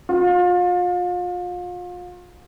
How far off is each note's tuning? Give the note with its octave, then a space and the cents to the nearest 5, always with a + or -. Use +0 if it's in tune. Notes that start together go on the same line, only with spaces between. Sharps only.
F4 +35